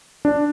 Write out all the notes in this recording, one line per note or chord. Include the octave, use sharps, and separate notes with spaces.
D4